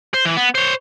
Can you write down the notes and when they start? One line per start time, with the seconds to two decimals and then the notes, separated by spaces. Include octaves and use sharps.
0.14 C5
0.25 E3
0.37 B3
0.55 C5 C#5